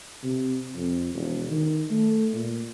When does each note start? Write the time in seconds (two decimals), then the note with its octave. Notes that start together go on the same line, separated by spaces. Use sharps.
0.24 C3
0.75 F2
1.14 E1
1.48 D#3
1.91 A3
2.34 A#2